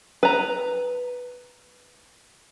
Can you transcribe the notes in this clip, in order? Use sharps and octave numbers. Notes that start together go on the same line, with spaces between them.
B4 A#5